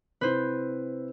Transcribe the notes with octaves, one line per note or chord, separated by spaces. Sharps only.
C3 E4 B4 C5